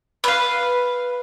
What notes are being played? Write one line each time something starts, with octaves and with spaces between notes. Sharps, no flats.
B4 F5